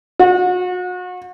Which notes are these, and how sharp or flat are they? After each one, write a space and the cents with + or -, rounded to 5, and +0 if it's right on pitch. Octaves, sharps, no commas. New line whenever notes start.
F#4 -35